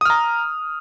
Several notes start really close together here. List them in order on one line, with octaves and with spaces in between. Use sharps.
D#6 F6 A#5